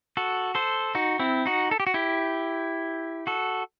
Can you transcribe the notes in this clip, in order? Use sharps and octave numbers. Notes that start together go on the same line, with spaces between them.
F#4 A4
A4 C5
D#4 F#4
C4 E4
D#4 F#4
A4
G4
F#4
E4 G4
F#4 A4